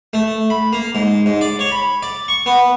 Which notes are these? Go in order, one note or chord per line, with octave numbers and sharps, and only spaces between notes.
A3
B5
A#3
G#2
G#2
D5
C#5
B5
D5
C#6
B3